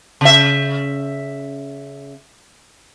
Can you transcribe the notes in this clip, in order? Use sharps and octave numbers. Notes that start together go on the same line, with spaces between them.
C#3 E5